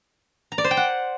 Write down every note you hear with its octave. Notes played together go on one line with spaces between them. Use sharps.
A#5
D5
C5
G5
F#5